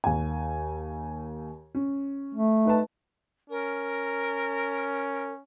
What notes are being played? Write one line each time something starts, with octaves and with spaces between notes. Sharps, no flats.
D#2 G#5
C#4
A3
D#4 B4 A5
C#4 A#4